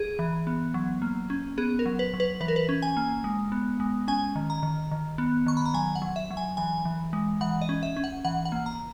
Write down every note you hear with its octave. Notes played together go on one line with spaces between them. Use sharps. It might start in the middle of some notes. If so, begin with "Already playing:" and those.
Already playing: G#4
E3
B3
F#3
A#3
C#4
B3 G#4
A#4
F#3
B4
F#3
B4
E3 B4
A#4
B4
C#4
G#5
A#3
G#3
B3
G#3
C#4 G#5
D#3
A#5
D#3
D#3
B3
D#3 C#6
B5
A#5
F#3 G#5
F#5
F#3
E5
F#3
G#5
E3 G#5
E3
G#3
E3 F#5
D#5
C#4
E5
C#4
F#5
E3 F#5
F#5
A#3
A#5